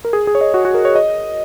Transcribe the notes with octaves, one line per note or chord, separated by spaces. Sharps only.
A#4
G#4
G#4
C#5
D#5
F#4
F#4
A#4
C#5
D#5